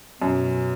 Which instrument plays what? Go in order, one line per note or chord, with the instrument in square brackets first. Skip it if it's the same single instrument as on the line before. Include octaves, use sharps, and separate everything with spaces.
[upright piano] F#2 [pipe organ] B2 F#3 C#4